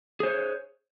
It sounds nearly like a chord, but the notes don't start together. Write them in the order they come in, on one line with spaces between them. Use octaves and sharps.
G#4 C5 C#5